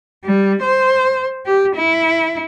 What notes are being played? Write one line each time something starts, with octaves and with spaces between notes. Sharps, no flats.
G3
C5
G4
E4